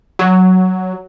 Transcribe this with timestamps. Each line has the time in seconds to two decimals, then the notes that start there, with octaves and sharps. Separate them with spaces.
0.19 F#3